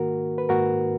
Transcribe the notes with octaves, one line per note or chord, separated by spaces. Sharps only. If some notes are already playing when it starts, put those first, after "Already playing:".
Already playing: G#2 D#3 A#3 F#4 A#4
B4
G#2 D#3 A#3 F#4 A#4